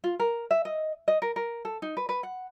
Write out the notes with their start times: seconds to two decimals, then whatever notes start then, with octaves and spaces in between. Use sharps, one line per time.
0.04 F4
0.20 A#4
0.51 E5
0.65 D#5
1.08 D#5
1.22 A#4
1.36 A#4
1.65 A4
1.82 D#4
1.97 B4
2.09 B4
2.23 F#5